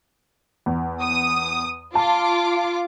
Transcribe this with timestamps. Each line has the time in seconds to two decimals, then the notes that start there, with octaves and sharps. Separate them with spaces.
0.66 E2
1.02 D#6
1.95 F4 A5 D6